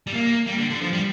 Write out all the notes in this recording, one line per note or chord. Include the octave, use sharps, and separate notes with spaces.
G3
A#3
G3
D3
D3
F3
G3